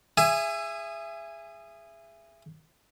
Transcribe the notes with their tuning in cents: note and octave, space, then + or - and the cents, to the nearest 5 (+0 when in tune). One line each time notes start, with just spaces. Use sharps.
G#4 -15 E5 +25 G#5 +0